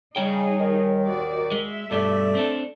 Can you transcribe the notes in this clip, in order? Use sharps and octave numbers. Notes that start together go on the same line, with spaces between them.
C#3 G3 D#4 G#4 C#5 G5
D#2 D#3
F#4 D5
G#3 E5
G2 B2 G3 A3 D5
C4 D4 A4